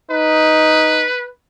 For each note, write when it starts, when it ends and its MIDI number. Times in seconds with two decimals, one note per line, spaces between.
0.10 1.07 63
0.10 1.29 71